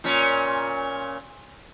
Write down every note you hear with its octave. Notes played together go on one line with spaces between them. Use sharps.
A#2 C#4